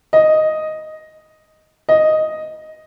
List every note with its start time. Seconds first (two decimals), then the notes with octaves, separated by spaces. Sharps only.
0.13 D#5
1.89 D#5